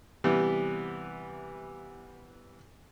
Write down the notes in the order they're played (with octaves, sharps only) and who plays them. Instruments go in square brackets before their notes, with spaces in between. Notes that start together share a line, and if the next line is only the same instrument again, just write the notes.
[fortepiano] C3 E3 G3 B3